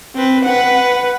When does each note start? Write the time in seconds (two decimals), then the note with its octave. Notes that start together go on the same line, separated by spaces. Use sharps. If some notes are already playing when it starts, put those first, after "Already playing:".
0.16 C4 B4
0.44 B4 F#5